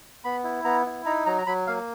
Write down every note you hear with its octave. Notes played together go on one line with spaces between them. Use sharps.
B3 B5
E4
B3 A#5
E4
D#4 A#5
F#3 A#5
A#5
F#3 B5
A#3 F5